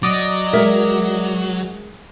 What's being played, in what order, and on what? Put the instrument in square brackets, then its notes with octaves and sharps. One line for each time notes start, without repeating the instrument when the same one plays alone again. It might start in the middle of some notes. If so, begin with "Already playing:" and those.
[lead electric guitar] F#3 [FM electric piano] D5 D#5 D6
[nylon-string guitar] G#3 A#4 E5